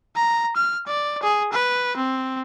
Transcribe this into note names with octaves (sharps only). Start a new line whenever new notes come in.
A#5
F6
D5
G#4
B4
C4